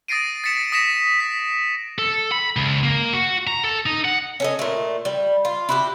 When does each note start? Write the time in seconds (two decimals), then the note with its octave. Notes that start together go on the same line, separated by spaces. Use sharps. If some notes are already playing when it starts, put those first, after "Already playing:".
0.08 D#6 A6 A#6 C7 D7 D#7
0.44 A6 B6 C#7 E7
0.72 D#6 A#6 B6 C#7 E7
1.20 B6
1.98 A4
2.32 B5
2.56 C#2
2.83 A#3
3.13 F#4
3.47 A#5
3.63 A4
3.86 D#4
4.05 F#5
4.40 C#4 A4 D#5
4.59 A#2 A3
5.05 G3
5.45 F4
5.69 E4 F#4 G4